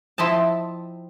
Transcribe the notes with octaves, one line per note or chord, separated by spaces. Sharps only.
F3 C4 E4 D#5 A5